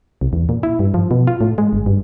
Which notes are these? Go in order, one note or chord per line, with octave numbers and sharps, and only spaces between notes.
C2
E2
A#2
E4
G2
F3
B2
F4
A2
G#3
G1
G2